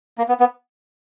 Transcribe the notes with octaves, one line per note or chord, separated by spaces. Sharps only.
A#3
B3
B3